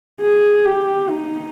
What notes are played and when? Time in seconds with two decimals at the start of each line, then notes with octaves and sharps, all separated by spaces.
0.21 G#4
0.65 G4
1.09 D#4